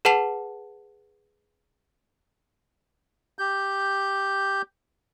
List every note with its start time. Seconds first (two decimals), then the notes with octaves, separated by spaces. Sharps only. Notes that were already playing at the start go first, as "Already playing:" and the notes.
0.05 G#4 B4 F#5 A5 C7 F7
3.38 G4 G6